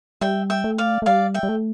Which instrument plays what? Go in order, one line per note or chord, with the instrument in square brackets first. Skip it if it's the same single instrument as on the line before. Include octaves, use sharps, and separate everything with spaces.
[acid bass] G3 [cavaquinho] E5 G5
[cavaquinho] E5 G5
[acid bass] A3
[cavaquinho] D5 F5
[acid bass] A3
[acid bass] G3 [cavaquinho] D5 F5
[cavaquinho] E5 G5
[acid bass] G3
A3